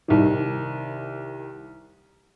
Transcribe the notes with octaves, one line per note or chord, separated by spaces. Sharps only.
C2 D#3